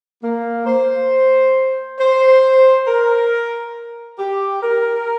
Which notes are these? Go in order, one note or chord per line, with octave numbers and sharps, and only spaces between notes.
A#3
C5
C5
A#4
G4
A#4